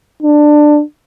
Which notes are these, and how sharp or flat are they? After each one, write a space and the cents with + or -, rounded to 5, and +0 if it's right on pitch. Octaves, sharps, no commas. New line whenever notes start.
D4 +15